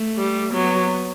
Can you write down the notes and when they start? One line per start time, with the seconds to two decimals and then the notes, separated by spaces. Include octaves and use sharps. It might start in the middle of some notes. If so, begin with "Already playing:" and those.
Already playing: A3
0.17 G3
0.53 F#3 B3